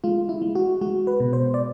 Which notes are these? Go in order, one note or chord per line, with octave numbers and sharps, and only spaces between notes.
G#3 F4
E4
G#3
F#4
G#3 F#4
B4
B2
C5
D5